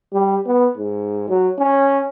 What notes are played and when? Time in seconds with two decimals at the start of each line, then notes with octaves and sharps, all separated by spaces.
0.13 G3
0.47 B3
0.78 G#2
1.28 F#3
1.59 C#4